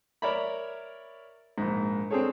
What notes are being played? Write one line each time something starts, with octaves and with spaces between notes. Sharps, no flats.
A#4 C#5 D5 E5 A#5 B5
A#1 G#2
C4 D4 G#4 A4 C#5